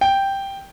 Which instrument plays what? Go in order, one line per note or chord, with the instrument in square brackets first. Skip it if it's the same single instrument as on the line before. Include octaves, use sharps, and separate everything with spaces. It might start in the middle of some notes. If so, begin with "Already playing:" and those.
[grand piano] G5